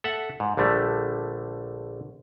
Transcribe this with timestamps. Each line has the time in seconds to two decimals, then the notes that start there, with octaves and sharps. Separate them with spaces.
0.04 A4 E5 F#5
0.40 G#2
0.57 A#1 D3 G3 A3